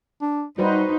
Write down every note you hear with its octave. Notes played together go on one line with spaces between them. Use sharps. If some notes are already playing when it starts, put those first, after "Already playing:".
D4
G3 D#4 F#4 B4 C5